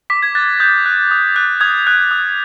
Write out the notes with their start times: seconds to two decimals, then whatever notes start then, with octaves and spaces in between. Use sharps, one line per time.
0.10 D6 B6
0.23 G#6
0.35 F#6 A6
0.60 D#6 G6
0.86 F#6
1.11 D#6
1.36 F#6
1.61 D#6 G#6
1.87 F#6
2.11 D#6